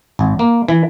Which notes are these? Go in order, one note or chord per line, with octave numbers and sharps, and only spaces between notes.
G#1
A#3
E3